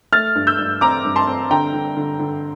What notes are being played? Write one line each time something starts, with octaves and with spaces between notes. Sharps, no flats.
A3 F6 A6
G2
E6 G6
G2
C4 A#5 D6
G2
A5 C6
C4
D3 G5 A#5
D3
D3
D3